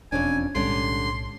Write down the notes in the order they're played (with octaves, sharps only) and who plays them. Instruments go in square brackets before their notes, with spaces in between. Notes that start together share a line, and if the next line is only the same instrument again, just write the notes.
[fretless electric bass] E1 [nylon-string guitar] F2 C#4 D4 [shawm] G#5
[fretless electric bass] B1 A2 G#3 [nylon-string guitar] D3 G3 C#4 [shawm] C6